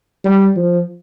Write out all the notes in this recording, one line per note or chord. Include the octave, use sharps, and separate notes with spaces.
G3
F3